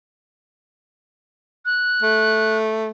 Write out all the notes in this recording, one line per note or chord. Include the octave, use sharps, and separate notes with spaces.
F#6
A3